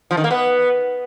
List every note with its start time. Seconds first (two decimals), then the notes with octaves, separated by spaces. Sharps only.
0.11 F3
0.17 D#3
0.24 A#3
0.31 B3